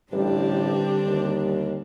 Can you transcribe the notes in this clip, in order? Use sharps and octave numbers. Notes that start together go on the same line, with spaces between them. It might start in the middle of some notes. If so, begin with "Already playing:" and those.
A1 D3 G3 C4 D4 G4
D#2